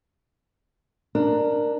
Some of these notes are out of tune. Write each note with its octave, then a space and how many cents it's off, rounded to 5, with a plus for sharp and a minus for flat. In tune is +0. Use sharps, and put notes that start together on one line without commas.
D4 +20 A#4 +0